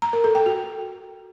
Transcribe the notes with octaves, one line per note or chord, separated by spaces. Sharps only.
A#5
A#4
A4
G5
F#4